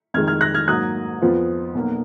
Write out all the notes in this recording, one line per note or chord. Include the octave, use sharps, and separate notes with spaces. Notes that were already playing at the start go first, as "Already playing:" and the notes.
F2 D#3 G#3 F6 G#6
F6 G#6
F#6 A#6
F6 G#6
G#2 F#3 A#3 D#6 F#6
F2 F3 B3 F4
B1 B2 A#3